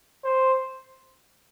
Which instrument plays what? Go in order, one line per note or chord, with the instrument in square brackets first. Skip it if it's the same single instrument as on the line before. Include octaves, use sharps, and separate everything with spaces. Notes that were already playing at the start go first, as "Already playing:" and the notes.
[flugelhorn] C5